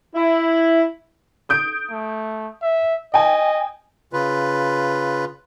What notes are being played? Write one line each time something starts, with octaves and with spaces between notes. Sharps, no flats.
E4
D#6 G6 D7
A3
E5
D#5 G5 G#5
C#3 F4 B4